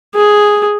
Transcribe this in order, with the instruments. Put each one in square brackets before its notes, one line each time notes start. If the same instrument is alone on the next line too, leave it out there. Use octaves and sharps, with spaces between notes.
[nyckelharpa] G#4